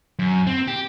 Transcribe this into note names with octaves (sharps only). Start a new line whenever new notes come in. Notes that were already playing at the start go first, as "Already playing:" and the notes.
F#2
C4
G4